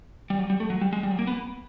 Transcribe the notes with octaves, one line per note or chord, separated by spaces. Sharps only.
G3
F#3
G3
A3
F#3
G3
G#3
G3
F#3
A#3
B3